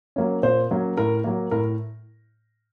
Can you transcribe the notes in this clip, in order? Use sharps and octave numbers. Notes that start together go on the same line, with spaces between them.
F#3 A#3 C#4
A#2 C5
F#3 A#3 C#4
A2 A#4
F#3 A#3
A2 A#4